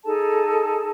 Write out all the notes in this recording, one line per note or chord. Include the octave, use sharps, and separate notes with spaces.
D#4 G#4 A4 A5